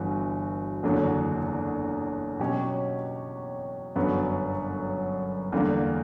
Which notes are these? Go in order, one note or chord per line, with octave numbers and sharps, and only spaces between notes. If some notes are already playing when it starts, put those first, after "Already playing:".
Already playing: G1 E3 F#4
F#1 E2 D3 F#3
B2 F#3 C#4 G4 C#5
G1 F#2 D3 F#3 B3
E2 D3 G3 A#3